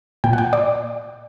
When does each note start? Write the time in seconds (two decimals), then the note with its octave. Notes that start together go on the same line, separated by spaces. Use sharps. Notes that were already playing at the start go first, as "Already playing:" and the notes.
0.24 A#2 G5
0.33 F#5
0.38 G5
0.53 D5